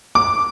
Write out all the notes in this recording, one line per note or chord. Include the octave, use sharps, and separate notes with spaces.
D6